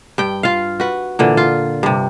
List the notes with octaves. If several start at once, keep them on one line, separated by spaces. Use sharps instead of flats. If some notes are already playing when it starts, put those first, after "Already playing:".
G2 G5
F4 F5
F#4 B4
A#2 D3 E3
F4
G2 C3